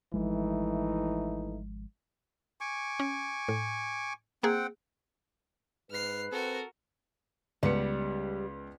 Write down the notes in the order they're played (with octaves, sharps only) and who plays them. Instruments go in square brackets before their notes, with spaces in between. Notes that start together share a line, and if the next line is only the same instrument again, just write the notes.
[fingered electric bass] G#1 F3 G#3 [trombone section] E3 A3 D#4
[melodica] G#5 C#6 D6
[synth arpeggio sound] C#4
A2
[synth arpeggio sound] A#3 G#4 [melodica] C4 F#5 G5
[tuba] G#2 [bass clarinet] B4 [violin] F6 C7
[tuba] C4 [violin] F#4 A#4 [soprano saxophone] A4
[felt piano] C#2 B3 C#7 [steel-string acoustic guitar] G3